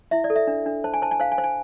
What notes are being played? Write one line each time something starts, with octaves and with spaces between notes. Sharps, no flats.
E4 E5
D5
A4
E5
D4
D4
C5 A5
G#5
C5 A5
G#5
C5 F5
G#5
C5
G#5